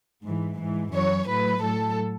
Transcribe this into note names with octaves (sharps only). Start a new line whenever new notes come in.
G#2 E3
G#2 E3
F#2 E3 C#5
A2 F#3 B4
A2 F#3 A4